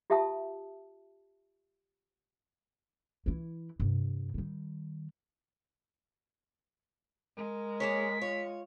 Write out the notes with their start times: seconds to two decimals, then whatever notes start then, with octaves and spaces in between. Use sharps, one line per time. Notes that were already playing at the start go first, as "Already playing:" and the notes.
0.10 F4 G4 E5 F#5 A5 D#6
3.26 E3 E4
3.80 G2 C3
4.34 D#3 G3
7.38 G#3 A#4
7.80 A#3 G#4 C#5 B6
8.22 F4 C#5